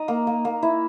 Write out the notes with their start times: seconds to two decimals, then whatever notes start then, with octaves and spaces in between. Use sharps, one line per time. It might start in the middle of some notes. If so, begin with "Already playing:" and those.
Already playing: D#4 D#6
0.08 A#3
0.27 A#3
0.45 A#3
0.62 E4 E5